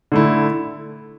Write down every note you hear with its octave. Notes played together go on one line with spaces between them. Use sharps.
D3 A3 E4